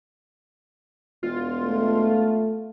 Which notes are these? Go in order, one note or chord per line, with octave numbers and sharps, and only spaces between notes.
E1 F4
A3